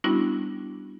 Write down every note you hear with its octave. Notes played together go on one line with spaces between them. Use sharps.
G3 B3 C#4 D4 E4 F#4